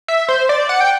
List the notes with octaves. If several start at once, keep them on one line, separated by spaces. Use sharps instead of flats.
E5
C5
D5
F#5
G5